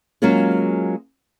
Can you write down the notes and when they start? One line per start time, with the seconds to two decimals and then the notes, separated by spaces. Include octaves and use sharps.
0.22 F#3 G#3 A#3 C#4 F4 G#4